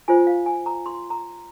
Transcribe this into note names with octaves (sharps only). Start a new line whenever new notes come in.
F4 C5 G#5
F5
G#5
A#5
C6
A#5